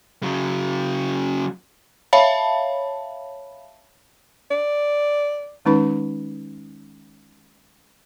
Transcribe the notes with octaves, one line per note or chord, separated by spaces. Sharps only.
C#3 F#3
C#5 E5 F5 A5 B5
D5
D#3 G#3 C#4 D#4 B4 B5